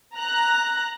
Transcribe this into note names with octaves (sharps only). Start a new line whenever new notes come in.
A#5 F#6